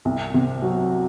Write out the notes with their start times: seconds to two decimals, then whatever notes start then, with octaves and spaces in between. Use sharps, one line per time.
0.05 C2
0.34 C3
0.62 F#3